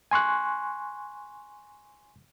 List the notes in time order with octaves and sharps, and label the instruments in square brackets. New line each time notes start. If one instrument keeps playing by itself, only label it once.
[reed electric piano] G#5 C6 C#6 F#6